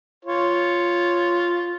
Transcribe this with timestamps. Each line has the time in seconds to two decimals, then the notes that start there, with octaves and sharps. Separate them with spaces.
0.25 F4 C#5